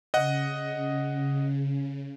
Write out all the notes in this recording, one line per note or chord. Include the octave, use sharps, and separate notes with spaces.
C#3 D#5 F#5